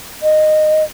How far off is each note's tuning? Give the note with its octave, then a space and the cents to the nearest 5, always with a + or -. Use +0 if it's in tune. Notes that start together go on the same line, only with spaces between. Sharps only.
D#5 -15